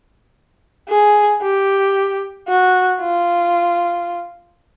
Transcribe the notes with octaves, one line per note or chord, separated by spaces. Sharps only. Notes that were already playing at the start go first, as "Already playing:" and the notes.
G#4
G4
F#4
F4